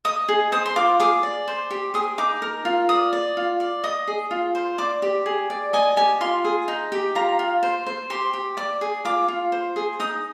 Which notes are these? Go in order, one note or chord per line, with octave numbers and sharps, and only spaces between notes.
D#5 D#6
G#4
C5 D#6
C6
F4 D6
G#4 D6
D5
C5
G4
G#4 D#6
D#4 D6
A#4
F4
D5 D#6
D5
F4
D5
D#5 D#6
G#4
F4
C5
D5 D6
G4
G#4
D5
D#5 G#5
G4 G#5
F4 C6
G#4
D#4
G4
F4 A#5
F4
C5
C5
G4 C6
G4
D5 D6
G#4
F4 D6
F4
C5
G#4
D#4 D#6